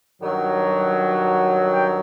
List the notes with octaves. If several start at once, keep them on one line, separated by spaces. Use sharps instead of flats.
G2 D#3 F#3
G5